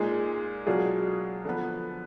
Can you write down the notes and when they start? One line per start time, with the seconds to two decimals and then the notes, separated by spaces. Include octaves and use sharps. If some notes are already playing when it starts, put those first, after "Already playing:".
Already playing: A#2 G#3 D#4 G#4
0.67 B2 F#3 D4 F4 G#4
1.44 D3 F3 B3